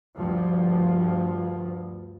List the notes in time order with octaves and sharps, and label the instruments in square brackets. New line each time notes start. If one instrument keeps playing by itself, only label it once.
[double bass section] D2 G2 F3